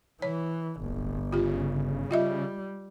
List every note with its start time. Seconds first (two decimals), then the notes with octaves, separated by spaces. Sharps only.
0.22 E3 C#5
0.83 D1 G1
1.33 C#3 F4 G4
2.11 G3 F4 D#5 E5